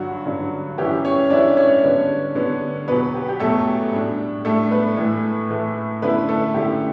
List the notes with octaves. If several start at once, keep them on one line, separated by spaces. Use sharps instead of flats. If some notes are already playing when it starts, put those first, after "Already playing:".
Already playing: G2 D3 F#3 F#4
G2 D3 F#3
F#2 E3 G3 C#4 E4 G4
C#4 C#5
F#2 E3 G3 C#4 D4 E4 D5
C#4 C#5
D3 G3 B3 D4
D3 G3 B3 D4
E2 B2 F#3 B3 B4
G4
G4
E2 B2 F#3 A3 A4
A2 G3 D4
A2 G3 A3 D4 A4
B3 B4
A2 E3 A3
A2 E3 A3
F#2 D3 A3 B3 E4 B4
A3 A4
F#2 D3 A3 E4 G4